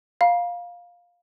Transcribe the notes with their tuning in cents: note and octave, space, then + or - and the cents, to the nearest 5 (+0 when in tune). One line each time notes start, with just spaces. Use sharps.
F5 +10 A#5 +45